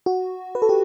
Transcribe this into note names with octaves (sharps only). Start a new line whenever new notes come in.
F#4
B4
A4
G4